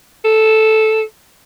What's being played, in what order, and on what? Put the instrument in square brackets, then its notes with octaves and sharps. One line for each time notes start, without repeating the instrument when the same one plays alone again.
[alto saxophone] A4